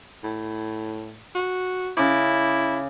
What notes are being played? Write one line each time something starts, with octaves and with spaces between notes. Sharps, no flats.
A2
F#4
C#3 E4 D6